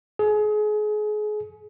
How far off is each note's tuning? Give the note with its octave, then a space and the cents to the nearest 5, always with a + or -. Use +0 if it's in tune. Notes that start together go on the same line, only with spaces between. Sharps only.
G#4 +30